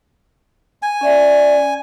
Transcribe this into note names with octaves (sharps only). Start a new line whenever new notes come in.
G#5
C#4 D5 E5